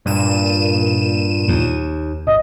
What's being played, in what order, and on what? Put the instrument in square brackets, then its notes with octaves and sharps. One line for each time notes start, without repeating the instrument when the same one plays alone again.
[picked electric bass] G2 [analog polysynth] A#2 D#7 E7
[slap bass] D#2
[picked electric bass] G#1 [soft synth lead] D#5